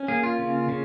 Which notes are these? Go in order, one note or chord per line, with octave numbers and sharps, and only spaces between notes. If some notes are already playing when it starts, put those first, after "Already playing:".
Already playing: C#4
A#3 G#4
F4
C#3
C#3